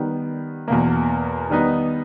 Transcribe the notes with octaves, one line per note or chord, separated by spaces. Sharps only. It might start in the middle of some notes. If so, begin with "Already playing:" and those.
Already playing: D#3 G3 B3
E2 B2 A#3
D#3 G3 B3 D#4